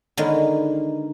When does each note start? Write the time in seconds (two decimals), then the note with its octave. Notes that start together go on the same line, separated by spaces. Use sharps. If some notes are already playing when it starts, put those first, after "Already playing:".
0.17 D3 D#3 G#3 A#3 B3 C#4